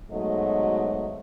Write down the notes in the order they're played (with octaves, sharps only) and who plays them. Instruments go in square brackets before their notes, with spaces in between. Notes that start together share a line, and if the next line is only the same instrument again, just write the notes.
[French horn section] G#2 B2 F#3 A3 D#5